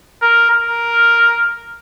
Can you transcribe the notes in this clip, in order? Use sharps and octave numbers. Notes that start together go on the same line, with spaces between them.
A#4
A#4